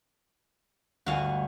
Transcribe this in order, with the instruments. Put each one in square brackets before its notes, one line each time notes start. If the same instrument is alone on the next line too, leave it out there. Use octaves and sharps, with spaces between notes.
[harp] G1 D2 G#5 [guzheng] F#4 F5